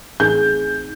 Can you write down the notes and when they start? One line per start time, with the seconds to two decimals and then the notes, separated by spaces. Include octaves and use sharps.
0.20 A1 C4 D#4 G#4 G6